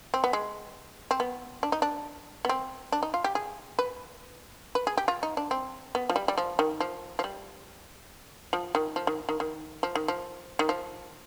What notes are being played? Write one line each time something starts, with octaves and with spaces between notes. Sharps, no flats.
C4
B3
G#3
C4
B3
D4
D#4
D4
B3
C4
D4
D#4
F4
G4
G#4
B4
B4
G#4
G4
F4
D#4
D4
C4
B3
F3
G3
G3
F3
D#3
F3
F3
G3
F3
D#3
F3
D#3
D#3
D#3
F3
D#3
F3
D#3
F3